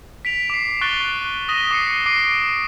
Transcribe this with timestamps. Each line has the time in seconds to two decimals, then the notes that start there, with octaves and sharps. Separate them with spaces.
0.25 B6 D7 F7
0.50 D6 C7
0.81 C#6 F#6 A6 D7 G7
1.48 D#6 A#6 B6 D#7 E7 G7
1.71 D6 C7 C#7
2.06 D6 C7 D7 D#7